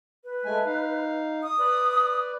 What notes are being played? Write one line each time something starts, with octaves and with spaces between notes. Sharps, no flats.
B4
G#3 A3 G#5
D#4 F5
D#6
B4 D5